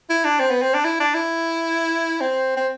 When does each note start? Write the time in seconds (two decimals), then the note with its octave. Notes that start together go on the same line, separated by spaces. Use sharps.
0.09 E4
0.25 D4
0.40 C4
0.51 B3
0.62 C4
0.74 D4
0.85 E4
1.00 D4
1.15 E4
2.21 C4
2.57 C4